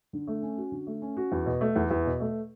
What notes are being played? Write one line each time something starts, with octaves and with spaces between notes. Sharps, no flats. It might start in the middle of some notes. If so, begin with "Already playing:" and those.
D3
A3
C#4
F#4
D3
A3
C#4
F#4
E2
B2
A3
E2
E2
B2
A3